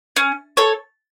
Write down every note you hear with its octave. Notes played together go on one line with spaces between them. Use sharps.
C#4
A4 C#5